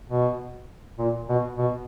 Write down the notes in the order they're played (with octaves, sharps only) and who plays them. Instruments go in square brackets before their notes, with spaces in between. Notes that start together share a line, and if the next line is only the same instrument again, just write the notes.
[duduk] B2
A#2
B2
B2